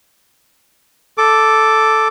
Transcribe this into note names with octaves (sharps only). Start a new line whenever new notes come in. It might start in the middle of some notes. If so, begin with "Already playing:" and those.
A4 D6